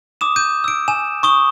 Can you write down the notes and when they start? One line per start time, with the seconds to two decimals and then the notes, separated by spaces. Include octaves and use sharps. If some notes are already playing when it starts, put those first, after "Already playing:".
0.21 D6 D#6 E7
0.36 G6 D#7
0.64 E6 D7
0.88 G#5 E7
1.23 C#6 D#6 G7